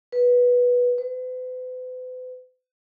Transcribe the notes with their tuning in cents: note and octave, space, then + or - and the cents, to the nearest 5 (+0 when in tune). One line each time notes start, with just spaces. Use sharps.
B4 -10
B4 +45